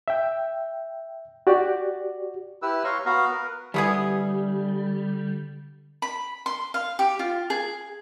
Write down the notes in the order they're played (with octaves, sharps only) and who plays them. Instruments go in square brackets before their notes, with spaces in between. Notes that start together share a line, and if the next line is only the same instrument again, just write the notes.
[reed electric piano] E5 G5
F#4 G4 D5
[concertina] E4 G4 B4 E6
C#5 F5 A#5 C6 C#6
B3 F#4 F5 A#5
A#4 B4
[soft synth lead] D3 [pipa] E3 B3 G#4 [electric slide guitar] G3
[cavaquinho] B5
C6
F5
G4
F4
G#4